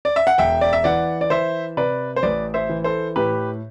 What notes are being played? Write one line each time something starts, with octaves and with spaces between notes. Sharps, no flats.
D5
E5
F#5
E1 E5 G5
D5
E5
E3 D5 F#5
D5
E3 C5 E5
C3 B4 D5
C5
A1 B4 D5
C5 E5
E3
A4 C5
A2 G4 B4